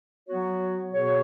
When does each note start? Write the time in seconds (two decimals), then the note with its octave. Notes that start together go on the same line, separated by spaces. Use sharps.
0.28 F#3 B3 F#4 C#5
0.92 B2 B3 G#4 C#5